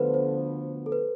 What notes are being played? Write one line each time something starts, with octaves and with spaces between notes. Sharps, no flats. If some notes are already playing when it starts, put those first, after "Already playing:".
Already playing: D2 D3 F3 B3 A4 B4 C5
C5
A4
B4